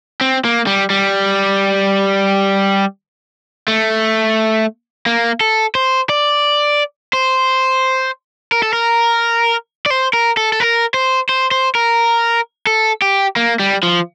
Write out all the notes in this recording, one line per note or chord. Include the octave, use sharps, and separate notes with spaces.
C4
A#3
G3
G3
A3
A#3
A4
C5
D5
C5
A#4
A4
A#4
D5
C5
A#4
A4
A4
A#4
C5
C5
C5
A#4
A4
G4
A#3
G3
F3